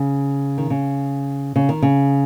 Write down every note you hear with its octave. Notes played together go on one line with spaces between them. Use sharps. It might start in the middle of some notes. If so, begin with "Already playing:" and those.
Already playing: C#3
D#3
C#3
C#3
D#3
C#3